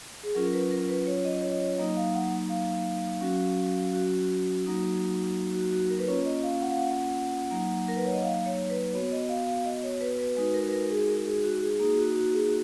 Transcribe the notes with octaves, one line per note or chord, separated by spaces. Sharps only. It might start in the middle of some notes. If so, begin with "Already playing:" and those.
G#4
F#3 C#4 F4 A#4
A#4
B4
A#4
B4
C#5
D#5
C#5
D#5
C#5
F#3 A#3 D#4 D#5
F5
F#5
F5
F#3 C#4 F#4
F#4
F#3 A#3 D#4 F#4
F#4
F#4
A#4
B4
A#3 C#4 F4 C#5
D#5
F5
F#5
F5
F#5
F#3 A#3 D#4
A#4
B4
C#5
D#5
F5
C#5
B4
B3 F#4 C#5
D#5
F5
F5
D#5
C#5
B4
B4
G#3 D#4 F#4 B4
A#4
B4
A#4
G#4
A#4
G#4
F#4
G#4
A#3 D#4 F#4 G#4
F#4
F#4
G#4
F#4